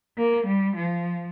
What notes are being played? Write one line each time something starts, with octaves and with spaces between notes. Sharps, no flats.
A#3
G3
F3